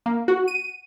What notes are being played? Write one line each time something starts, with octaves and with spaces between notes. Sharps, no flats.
A#3
F#4
D#7